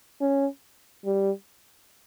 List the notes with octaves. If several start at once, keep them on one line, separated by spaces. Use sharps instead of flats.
C#4
G3